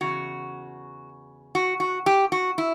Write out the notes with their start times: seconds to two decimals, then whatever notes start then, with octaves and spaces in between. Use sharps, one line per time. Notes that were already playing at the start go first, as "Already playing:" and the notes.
0.01 E2 C#3 F#4
1.55 F#4
1.80 F#4
2.06 G4
2.32 F#4
2.58 E4